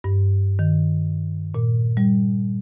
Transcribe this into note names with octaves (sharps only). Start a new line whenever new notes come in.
G2
D#3
A#2
G3